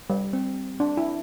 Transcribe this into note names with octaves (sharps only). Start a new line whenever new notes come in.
G3
C4
D4
E4